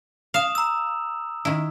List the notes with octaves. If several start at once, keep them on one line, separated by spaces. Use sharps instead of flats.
F5 D#6 E7 F7
A#5 E6
D#3 E4